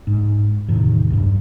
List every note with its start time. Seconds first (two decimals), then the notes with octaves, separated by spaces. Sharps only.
0.07 G#2
0.68 E2 A2 C3 D#3
1.10 B1 G2